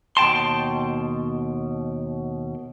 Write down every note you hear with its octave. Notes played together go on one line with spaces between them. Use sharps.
D#2 B2 G5 A5 C6